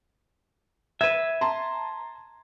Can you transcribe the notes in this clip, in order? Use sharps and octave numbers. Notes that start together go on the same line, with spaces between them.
B4 E5 G#6
A5 A#5 C6